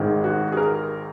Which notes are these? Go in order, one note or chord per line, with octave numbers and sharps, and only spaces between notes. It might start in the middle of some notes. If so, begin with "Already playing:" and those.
Already playing: G#1 G#2 D#3 G#3
F#4
G#4
A#4